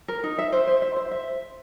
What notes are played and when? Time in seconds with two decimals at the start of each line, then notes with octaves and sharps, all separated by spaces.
0.08 A#4
0.24 D#4
0.38 E5
0.52 C5
0.67 C5
0.82 E5
0.96 C5
1.11 E5